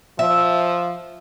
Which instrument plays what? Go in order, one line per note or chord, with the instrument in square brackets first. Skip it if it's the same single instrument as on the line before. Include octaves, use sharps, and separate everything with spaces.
[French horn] F3 [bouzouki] E5